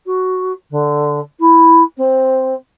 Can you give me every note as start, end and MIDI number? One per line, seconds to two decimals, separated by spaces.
0.06 0.52 66
0.70 1.19 50
1.39 1.83 64
1.97 2.54 60